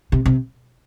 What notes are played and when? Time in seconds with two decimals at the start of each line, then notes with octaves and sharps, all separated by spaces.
0.12 C3
0.26 C3